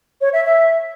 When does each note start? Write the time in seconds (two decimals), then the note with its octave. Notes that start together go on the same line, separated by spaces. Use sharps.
0.21 C#5
0.33 E5
0.44 E5